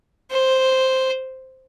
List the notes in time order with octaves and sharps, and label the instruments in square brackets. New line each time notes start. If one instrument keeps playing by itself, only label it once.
[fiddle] C5